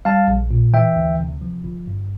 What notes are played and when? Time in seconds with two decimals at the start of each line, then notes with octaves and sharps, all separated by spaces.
0.05 G3 F5 A5
0.28 A#1
0.51 A#2
0.73 E3 E5 G5
0.96 D2
1.19 C3
1.41 F3
1.64 G1
1.87 G2